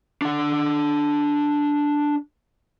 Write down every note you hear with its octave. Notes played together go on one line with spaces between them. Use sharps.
D4 F#5